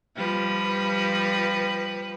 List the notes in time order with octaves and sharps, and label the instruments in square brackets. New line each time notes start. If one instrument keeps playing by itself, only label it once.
[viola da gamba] F3 G3 B4